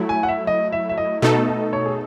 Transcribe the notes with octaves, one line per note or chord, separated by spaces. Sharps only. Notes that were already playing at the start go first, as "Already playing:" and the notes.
Already playing: F#3 A3 E4
G#5
F#5
E5
D#5
E5
E5
D#5
B2 A3 D#4 A4
D#5
C#5
G#4